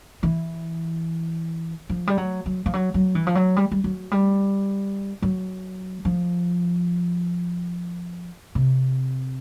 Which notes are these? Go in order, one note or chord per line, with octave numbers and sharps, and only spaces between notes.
E3
F3
G3
F#3
F#3
F3
F#3
F#3
E3
F3
F#3
G3
G3
F#3
G3
F#3
F3
C3